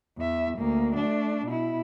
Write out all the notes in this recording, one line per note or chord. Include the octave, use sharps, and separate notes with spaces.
E2 E5
D2 A#3
A3 D4
B2 E4